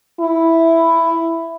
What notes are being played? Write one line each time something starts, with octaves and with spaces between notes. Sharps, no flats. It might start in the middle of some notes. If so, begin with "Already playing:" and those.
E4